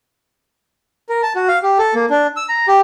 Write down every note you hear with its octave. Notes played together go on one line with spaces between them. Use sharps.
A#4
A5
F#4
F5
G4
A4
A#3
D4
E6
A#5
G4